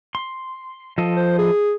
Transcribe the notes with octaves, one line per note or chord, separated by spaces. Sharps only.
C6
F3 A4 D#5
C5
G#4